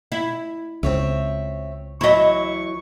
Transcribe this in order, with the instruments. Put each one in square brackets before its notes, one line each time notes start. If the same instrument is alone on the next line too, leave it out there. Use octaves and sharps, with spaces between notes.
[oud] E4
[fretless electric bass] C#2 [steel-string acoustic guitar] C4 C#5 E5
[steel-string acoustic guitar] E3 F#3 [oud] E4 D#5 [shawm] C#6